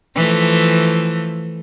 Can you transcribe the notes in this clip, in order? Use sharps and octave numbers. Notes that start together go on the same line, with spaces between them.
E3 F3 A3